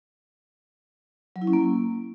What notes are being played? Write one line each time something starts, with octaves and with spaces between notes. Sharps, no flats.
F#3
E4
C#4
A#3